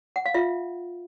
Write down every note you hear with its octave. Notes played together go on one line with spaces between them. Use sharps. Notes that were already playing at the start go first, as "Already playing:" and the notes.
F#5
F5
F4 E5